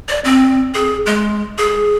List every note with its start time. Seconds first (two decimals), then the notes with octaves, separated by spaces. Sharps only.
0.09 D5
0.25 C4
0.74 G#4
1.06 G#3
1.58 G#4